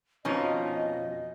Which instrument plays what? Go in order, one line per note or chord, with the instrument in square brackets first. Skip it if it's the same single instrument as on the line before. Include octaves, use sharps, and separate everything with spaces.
[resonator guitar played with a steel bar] F2 B2 D#4 [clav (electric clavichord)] F3 C#4 [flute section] D#5